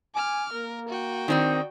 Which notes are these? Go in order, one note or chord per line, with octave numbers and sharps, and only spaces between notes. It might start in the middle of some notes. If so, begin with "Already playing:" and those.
G#5 D6 F6
A#3 A#4
F#4 G5
D#3 C4 D#4 D5